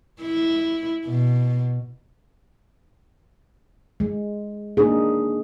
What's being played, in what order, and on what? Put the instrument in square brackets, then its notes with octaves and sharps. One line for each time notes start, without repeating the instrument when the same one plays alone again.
[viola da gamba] E4
B2
[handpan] G#3
A#3 D4 D#4 G#4